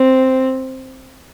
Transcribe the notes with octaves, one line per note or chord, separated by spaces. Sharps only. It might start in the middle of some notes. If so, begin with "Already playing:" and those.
Already playing: C4